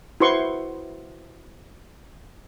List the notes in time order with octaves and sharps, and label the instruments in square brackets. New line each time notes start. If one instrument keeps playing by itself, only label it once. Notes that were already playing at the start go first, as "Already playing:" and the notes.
[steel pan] E4 F#4 B4 C5 C6 C#6